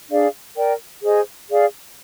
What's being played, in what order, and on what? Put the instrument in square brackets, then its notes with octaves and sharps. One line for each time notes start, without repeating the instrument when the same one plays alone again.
[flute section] D4 G#4 D5 F5
A#4 D5 G5
G#4 C5 D#5
G#4 D5 F5